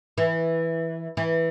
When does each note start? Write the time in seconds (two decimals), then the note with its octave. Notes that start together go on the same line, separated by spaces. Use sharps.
0.18 E3
1.17 E3